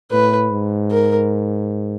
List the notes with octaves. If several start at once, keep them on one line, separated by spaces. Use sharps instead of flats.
A2 B4
G#2
A#4